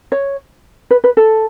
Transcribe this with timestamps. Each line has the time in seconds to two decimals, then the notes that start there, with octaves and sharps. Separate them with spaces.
0.12 C#5
0.91 B4
1.04 B4
1.17 A4